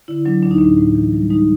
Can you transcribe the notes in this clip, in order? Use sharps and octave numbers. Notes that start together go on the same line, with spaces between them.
D3 E4
F#3 D4
D2 D4
D#4
A2 D4
A2
E3
G3
G#3 D#4